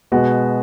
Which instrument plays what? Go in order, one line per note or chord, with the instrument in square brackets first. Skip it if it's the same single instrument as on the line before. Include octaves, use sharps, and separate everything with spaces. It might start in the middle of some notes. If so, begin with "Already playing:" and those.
[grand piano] B2 G#3 B3 F#4